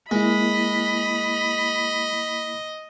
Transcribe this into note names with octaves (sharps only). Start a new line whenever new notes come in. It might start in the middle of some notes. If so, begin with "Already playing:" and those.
G#3 A#3 E4 D#5 B5